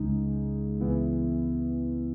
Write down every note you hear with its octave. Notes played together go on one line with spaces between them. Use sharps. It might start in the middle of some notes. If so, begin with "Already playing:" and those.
Already playing: C#2 C#3 G#3 D#4
C#2 C#3 E3 B3 E4